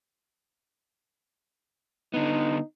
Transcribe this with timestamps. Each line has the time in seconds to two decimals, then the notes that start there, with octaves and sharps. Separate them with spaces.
2.14 D3 B3 D#4